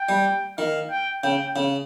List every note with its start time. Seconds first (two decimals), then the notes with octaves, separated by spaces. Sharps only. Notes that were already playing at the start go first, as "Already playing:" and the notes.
Already playing: G5
0.09 G3
0.58 D#3 F5
0.90 G5
1.23 C#3 G5
1.56 C#3